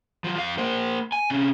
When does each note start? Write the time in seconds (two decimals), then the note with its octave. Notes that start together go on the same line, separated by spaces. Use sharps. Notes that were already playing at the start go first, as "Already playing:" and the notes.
0.24 F3 F#3
0.38 F2 F5
0.58 A#3 C5
1.12 G#5
1.30 C3 C#4